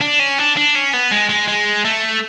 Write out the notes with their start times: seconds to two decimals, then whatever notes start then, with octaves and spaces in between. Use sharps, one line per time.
0.01 D4
0.19 C#4
0.38 D4
0.56 D4
0.75 C#4
0.93 B3
1.11 G#3
1.29 G#3
1.48 G#3
1.85 A3